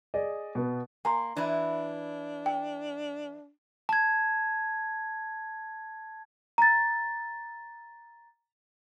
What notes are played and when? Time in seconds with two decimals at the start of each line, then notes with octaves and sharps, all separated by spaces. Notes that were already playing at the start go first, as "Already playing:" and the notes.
0.14 G#4 D5 D#5
0.55 B2 B3
1.05 A#3 G#5 A#5 C6
1.36 E3 D4 E4
2.46 G5
3.89 A5 G#6
6.58 A#5 A6